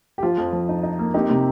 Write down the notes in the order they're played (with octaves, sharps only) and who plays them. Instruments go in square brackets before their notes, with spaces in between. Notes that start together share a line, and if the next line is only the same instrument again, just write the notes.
[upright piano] G4
F3 F4
F2
F3
D#4
D#4
A#3
C4 D#4 G4
C3